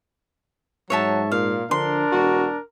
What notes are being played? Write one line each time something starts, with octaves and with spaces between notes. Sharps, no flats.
G#2 F#3 C#5 E5 A5
A#2 F5
D3 F3 D4 A#4 C6
E1 F#4